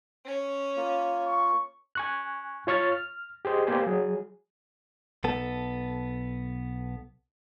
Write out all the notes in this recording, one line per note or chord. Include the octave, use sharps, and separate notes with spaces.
C#4 C#5
A#3 F4
C#6
G#5 C#6 F#6
F4 C#5 C#6 F6 A6
F6
G4 G#4 C5 D#5
A#3 B3 G4 C5 D5 G#5
F#3 G#4
B1 B3 A4